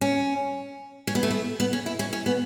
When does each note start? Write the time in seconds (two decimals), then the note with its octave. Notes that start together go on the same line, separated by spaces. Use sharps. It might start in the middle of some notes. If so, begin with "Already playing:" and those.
0.01 C#4
1.07 C#4
1.15 B3
1.23 A3
1.31 B3
1.60 B3
1.73 C#4
1.86 E4
1.99 C#4
2.13 C#4
2.26 B3